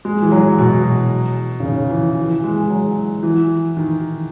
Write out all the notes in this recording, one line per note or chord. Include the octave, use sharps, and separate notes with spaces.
G#3
E3
F#3
B2
C#3
D#3
E3
E3
G#3
F#3
E3
D#3